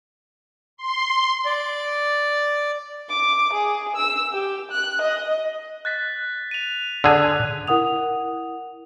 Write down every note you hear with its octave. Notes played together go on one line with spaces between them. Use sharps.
C6
D5
D6
G#4
E6
G4
F#6
D#5
F#6 A6 B6
D#7 F7
D3 G#4 F#6 G#6
E4 A#4 F#5 D#6 F7